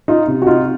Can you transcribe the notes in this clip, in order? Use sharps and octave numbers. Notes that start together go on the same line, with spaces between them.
D#4 F4
C3
F#4
D#4 F4